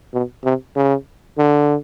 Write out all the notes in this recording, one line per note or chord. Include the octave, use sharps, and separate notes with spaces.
B2
C3
C#3
D3